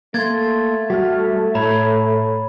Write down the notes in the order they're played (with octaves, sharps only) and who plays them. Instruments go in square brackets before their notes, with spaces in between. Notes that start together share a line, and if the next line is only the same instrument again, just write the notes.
[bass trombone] A3 [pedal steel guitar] A#3 C6 [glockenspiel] G#6 A6
[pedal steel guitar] G3 F6 [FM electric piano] F#4
[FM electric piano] A2 [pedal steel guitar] C#5 [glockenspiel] A#5 B5